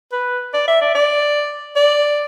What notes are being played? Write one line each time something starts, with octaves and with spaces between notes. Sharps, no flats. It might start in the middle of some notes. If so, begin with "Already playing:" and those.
B4
D5
E5
D5
D5
D5